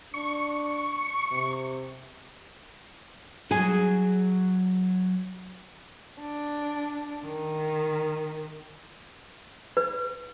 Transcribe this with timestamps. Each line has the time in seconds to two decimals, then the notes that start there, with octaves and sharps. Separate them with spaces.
0.14 D4 C#6
1.32 C3
3.51 F#3 G#4
6.20 D4
7.24 D#3
9.77 B4